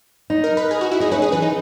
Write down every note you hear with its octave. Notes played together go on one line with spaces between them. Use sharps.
D#4
A#4
B4
G#4
F#4
E4
D#4 G#4
C#4 B4
G#4
E3 B4
D#4